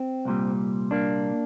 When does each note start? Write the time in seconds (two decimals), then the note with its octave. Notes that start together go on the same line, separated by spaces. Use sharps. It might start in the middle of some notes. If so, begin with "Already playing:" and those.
Already playing: C4
0.25 C2 A#2 G3
0.91 A#3 D4